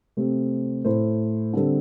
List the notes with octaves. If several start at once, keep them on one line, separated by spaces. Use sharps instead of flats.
C3 A3 C4
A2 A3 E4 C5
D3 G3 C4 A4